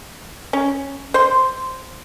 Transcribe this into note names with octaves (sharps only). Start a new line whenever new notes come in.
C#4
C5 C6